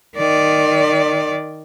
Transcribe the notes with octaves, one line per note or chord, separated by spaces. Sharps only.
D#3 D5